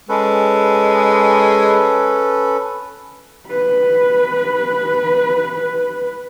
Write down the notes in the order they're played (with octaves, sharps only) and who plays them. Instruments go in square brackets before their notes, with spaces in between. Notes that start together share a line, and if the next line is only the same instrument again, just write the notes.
[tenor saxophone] G#3 [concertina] C#4 A4 B4
[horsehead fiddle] B4 B5